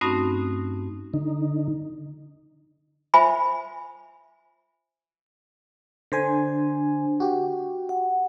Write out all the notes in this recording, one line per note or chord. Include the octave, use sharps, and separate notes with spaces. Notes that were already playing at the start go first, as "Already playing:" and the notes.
G2 A3 C4 C#4 D#4 F#4
D3 D#4
F4 C5 E5 G#5 B5
D3 D4 C5 G#5
F#4 G4
F#5